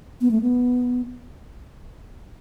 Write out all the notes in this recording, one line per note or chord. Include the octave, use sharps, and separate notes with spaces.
B3
A3
B3